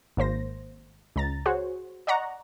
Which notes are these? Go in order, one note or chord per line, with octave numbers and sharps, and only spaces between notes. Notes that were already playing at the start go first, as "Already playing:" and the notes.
G#1 A#3 C5 A#6
C#2 A#5 A6
F#4 G#4 C5 C#5
D5 D#5 F#5 A#5 C#6